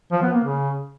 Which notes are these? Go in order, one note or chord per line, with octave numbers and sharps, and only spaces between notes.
F3
B3
A#3
C#3